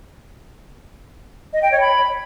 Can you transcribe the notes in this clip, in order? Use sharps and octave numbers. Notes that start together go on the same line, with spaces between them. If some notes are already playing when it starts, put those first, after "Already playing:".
D#5
G5
C#5
B5